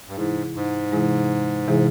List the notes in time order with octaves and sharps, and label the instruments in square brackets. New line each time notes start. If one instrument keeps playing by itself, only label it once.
[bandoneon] G2
[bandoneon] G#2 [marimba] C3 E3 G#3 E4 G#4
[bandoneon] G#2
[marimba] C3 E3 G#3 E4 G#4
C3 E3 G#3 E4 G#4